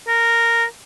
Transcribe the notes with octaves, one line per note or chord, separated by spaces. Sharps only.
A#4